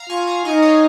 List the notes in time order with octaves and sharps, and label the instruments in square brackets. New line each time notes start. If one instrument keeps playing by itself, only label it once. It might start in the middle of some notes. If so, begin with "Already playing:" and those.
Already playing: [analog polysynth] F5 A#5
[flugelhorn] F4 [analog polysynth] G#5 C#6
[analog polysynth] F5 A#5
[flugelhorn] D#4 [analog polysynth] D#5 G#5
[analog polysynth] C#5 F5